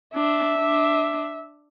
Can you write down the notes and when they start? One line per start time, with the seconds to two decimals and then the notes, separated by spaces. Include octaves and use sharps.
0.14 D4 E5
0.57 D4